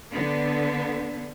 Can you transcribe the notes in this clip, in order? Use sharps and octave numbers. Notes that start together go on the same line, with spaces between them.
D3 B3